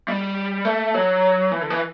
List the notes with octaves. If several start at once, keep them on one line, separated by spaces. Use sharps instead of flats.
G3
A3
F#3
E3
D3
E3